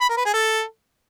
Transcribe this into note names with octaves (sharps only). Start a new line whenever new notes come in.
B5
A#4
B4
G#4
A4